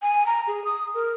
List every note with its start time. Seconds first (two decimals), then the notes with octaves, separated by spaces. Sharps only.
0.02 G#5
0.26 A#5
0.47 G#4
0.65 D#6
0.95 A#4